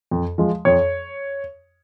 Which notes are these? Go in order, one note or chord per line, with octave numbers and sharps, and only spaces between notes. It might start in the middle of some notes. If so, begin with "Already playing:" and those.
F2
F3 G#3
F2 C#5